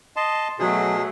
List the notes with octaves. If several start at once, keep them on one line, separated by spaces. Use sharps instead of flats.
D#5 A5 C6
B2 F#3 A3 G#4